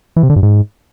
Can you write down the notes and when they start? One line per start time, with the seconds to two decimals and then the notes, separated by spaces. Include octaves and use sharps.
0.16 E3
0.23 C3
0.30 D3
0.36 G2
0.43 G#2